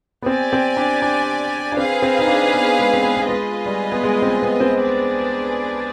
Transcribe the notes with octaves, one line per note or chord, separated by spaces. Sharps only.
B3
C4 G4 D5 G#5
C4
D4
D4
D4
C4 G#4 B4 F5
C4
D#4
D4
B3
G#3
C4
B3
B3
G#3 F4 B4 D#5 G#5
G3
B3
G#3
C4
B3
C4
D4 G#4 B4 D5 G#5